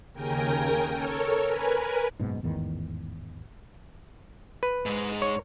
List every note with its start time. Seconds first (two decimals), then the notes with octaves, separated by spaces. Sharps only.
0.13 D#2 C#3 A#4 G5 G#5 A#6
0.89 A4 A#4 C#5
1.44 A#4 B4 G#5
2.19 F#1 G#2 B2
2.43 A1 E2 G#2 D#3
4.63 B4
4.86 G#2 G#3
5.22 C#5